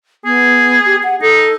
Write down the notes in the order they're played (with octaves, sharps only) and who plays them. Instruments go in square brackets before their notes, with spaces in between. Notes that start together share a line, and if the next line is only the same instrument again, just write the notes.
[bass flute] B3 [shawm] G#4
[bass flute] G4
F#5
[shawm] D#4 [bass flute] A4